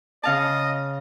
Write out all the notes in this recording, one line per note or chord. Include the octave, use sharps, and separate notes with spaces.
C#3 D#5 F5 A5